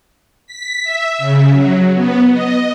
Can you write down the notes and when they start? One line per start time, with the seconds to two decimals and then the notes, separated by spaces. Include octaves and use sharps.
0.47 B6
0.84 E5
1.18 C#3
1.51 F#3
1.95 B3
2.32 D#5